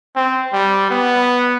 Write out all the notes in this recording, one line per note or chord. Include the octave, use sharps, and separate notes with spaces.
C4
G3
B3